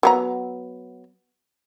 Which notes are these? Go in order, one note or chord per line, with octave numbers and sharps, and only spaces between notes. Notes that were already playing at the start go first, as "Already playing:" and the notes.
F#3 B3 A#5